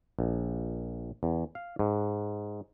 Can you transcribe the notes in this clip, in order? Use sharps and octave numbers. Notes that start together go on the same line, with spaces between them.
A#1
E2
F5
G#2